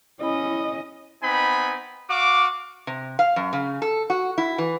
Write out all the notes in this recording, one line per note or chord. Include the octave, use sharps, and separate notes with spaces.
C#4 E4 D#5 B5
B3 C4 D#4 G#5 B5
F#4 F5 D6
C3
F5
F#2
C#3
A4
F#4
E4
E3